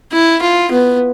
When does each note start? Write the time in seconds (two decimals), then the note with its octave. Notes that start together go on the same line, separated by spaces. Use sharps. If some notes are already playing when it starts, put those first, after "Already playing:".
0.12 E4
0.42 F4
0.71 B3